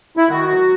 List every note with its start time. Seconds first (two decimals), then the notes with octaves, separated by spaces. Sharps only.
0.17 E4
0.29 D#3 F#4
0.48 F#3